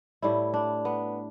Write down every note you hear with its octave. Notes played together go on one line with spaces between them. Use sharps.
A2 G3 E4
D4
B3